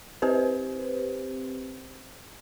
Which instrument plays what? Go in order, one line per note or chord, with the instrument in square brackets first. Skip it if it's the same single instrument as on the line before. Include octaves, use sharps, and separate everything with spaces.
[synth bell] C4 G4 B4 C5